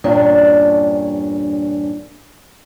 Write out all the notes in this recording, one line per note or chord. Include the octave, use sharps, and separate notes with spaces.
E2 G2 A#2 C#4 D4